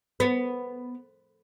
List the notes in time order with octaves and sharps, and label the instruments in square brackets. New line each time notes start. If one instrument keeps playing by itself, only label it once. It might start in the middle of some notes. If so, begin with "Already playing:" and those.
[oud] B3